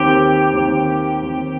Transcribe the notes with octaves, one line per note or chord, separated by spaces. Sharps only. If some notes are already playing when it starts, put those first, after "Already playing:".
Already playing: D#2 D#3 C4 G4
D#2 D#3 C4
D#2 D#3 C4